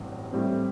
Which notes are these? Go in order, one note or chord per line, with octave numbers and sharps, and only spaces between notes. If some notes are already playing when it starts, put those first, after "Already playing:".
Already playing: A1 G2 F#3 C4
A2 G3 C4